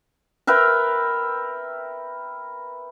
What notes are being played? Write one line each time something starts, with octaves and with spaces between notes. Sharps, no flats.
A#4 B4 E5 G5